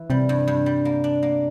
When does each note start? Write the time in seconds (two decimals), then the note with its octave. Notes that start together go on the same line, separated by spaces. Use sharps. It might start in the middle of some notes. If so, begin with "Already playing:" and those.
Already playing: E3
0.10 C3 G3
0.29 G2
0.48 G2
0.66 G3
0.85 A#3
1.04 D4
1.23 A#3